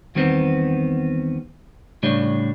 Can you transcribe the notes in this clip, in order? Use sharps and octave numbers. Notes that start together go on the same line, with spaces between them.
E2 D#3 G3 B3 C4
A2 C#3 G3 D4 C#5